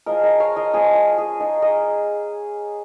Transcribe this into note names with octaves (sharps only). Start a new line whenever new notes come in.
F3 G#3 F4 A#4 D#5
A#4 D#5
C#5 F5
A#4 D#5
F3 G#3 C#4 F4 G#4
F4
G#4
G#3 D#4 F4 A#4
A#4 D#5